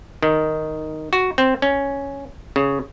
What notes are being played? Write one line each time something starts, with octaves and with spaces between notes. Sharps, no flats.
D#3
F#4
C4
C#4
C#3